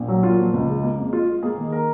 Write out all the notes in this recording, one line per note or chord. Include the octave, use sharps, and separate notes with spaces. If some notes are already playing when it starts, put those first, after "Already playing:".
Already playing: A#1
F#3
A#2 F4
F3
C#2
G#3
A#3
F2
G#3 F4
G#3
A#3 G#4
D#3
A#4